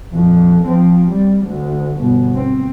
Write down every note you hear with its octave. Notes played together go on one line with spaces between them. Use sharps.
A#1 F2
F3 C4
G3
D2
G1 B2
C4